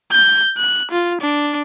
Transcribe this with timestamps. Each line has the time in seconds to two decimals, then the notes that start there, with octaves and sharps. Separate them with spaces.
0.12 G6
0.57 F#6
0.91 F4
1.21 D4